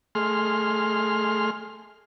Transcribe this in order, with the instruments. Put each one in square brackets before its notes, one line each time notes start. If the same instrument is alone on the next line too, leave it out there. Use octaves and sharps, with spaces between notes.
[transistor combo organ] A3 G#4 C6 F6